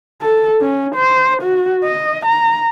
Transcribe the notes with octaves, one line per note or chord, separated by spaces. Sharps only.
A4
C#4
C5
F#4
D#5
A#5